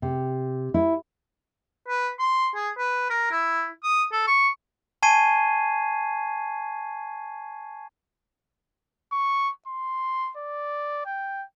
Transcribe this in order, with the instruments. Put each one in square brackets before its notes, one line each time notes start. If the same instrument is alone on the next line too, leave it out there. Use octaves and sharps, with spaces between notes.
[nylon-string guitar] C3
E4
[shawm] B4
C6
G#4
B4
A#4
E4
D#6
A4
C#6
[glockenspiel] G#5 A5 C#6 G#6 C7 D#7
[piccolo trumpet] C#6
C6
D5
G5